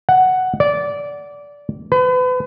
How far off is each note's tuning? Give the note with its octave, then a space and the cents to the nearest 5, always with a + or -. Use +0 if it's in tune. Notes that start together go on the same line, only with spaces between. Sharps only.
F#5 +5
D5 -15
B4 +35